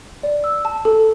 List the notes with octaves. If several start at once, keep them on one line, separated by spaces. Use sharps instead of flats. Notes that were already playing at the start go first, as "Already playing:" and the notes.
D5
E6
A5
A4